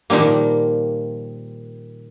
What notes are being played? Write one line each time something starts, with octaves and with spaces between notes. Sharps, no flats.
A#2 D#3 F3 G3 A#3